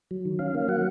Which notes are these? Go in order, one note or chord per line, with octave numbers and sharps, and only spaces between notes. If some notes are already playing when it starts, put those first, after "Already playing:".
F#3
D#3
C#4 F5
A#3
F#3 F#5